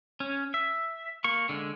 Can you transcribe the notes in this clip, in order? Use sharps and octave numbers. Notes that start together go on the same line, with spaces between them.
C#4
E5
A#3 C#6
D3 G#3